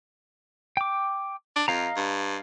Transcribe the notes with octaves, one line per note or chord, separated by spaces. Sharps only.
G5 D6
D4
F2 D#5 F5 A#5
G2